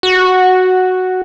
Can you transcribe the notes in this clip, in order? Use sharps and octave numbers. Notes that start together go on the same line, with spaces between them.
F#4